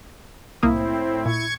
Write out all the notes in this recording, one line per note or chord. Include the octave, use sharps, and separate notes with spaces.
C2 A2 A#3 C4 E4 D#6
A#2 C#6 G#6